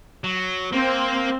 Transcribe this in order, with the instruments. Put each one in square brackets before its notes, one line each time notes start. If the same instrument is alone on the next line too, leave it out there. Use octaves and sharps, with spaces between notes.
[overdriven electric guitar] F#3
[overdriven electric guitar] A#3 [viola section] C4